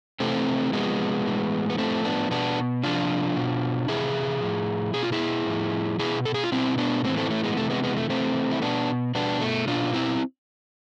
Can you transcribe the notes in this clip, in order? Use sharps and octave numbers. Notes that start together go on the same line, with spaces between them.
C3 E3 A3 C4
C3 F3 G#3 B3
A2 E3
B3
A2 F3 A3 C4
B3 D4
B2 B3 D4
C3 F3 D4 F4
B2
C3 E3 E4 G#4
A2 F3
B2 G#4
F4
E4 G#4
A2 F3
B2 E4 G#4
A4
G#4
F4
B2 C4 E4
B3 D4
A2 E3 A3 C4
A3 C4
A3
G#3 B3
C3 E3 A3
G#3 B3
G#3 B3
A3
C3 E3 A3 C4
E4
B2 B3 D4
B2 B3 D4
A3
B2 D4 F4
C4 E4